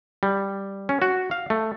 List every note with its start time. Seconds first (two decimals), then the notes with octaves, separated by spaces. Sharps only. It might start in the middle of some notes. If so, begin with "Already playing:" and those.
0.23 G3
0.89 C#4
1.02 F#4
1.31 F5
1.50 A3